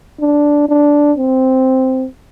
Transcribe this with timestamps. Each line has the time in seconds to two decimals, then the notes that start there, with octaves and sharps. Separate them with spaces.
0.20 D4
0.68 D4
1.18 C4